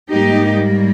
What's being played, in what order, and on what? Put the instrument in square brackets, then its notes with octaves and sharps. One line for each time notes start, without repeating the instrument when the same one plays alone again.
[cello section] G#2 G3 A#3 D#4 G4